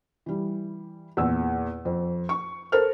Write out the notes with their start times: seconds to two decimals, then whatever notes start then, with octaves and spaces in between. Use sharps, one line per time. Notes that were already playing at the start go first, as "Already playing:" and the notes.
0.26 E3 G3
1.17 E2 A#2 E6
1.85 F2
2.29 C#6
2.72 A4 A#4 C5 F6